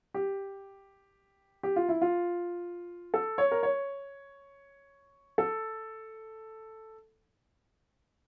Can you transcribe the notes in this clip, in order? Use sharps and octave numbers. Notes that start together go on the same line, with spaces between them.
G4
G4
F4
E4
F4
A4
C#5
A#4
C#5
A4